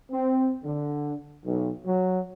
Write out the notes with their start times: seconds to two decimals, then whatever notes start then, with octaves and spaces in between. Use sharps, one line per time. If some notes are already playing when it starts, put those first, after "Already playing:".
0.12 C4
0.64 D3
1.45 B1
1.86 F#3